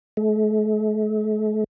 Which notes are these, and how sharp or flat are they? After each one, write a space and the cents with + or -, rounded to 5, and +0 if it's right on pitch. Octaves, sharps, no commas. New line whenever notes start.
A3 -45